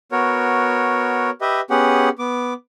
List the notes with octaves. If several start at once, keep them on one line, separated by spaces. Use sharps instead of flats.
B3 F#4 A#4 C#5
G4 B4 D#5 E5
B3 C#4 G4 G#4 F#5
B3 D6